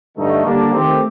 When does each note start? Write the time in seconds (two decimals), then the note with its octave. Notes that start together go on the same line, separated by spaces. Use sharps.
0.16 G2 D3 A3 D#4
0.44 D3 G3 A#3 D4
0.73 D#3 A3 C4 G4